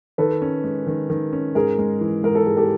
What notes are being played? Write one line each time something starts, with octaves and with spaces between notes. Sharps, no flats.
D#3 A4 B4
C#4
G#3
D#3
D#3
C#4
G#2 G#4 A#4
G#3
E3
G#2 A#4
A4
G#2 G#4
G4 A4